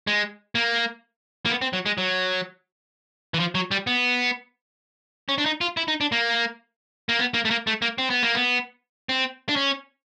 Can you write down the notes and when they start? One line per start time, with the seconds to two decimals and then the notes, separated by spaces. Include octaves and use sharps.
0.07 G#3
0.55 A#3
1.45 A#3
1.50 B3
1.62 C4
1.73 F#3
1.86 G#3
1.98 F#3
3.34 E3
3.40 F3
3.55 F#3
3.71 G3
3.87 B3
5.29 C#4
5.38 D4
5.46 D#4
5.61 F4
5.77 E4
5.88 D#4
6.01 D4
6.12 A#3
7.09 A#3
7.19 B3
7.34 A#3
7.45 A3
7.51 A#3
7.67 A3
7.82 A#3
7.98 C4
8.10 B3
8.23 A#3
8.35 B3
9.09 C4
9.49 D4
9.56 C#4